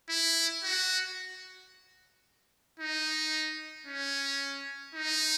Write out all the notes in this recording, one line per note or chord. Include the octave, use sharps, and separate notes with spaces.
E4
F#4
D#4
C#4
D#4